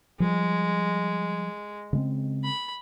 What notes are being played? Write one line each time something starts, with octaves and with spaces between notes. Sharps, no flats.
F3 G3 G#3
C#3 G#3 C4
B5